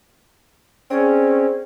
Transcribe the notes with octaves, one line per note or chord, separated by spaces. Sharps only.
C4 C#4 G#4 D5